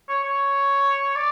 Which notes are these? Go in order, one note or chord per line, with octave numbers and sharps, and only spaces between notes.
C#5
C#5
D5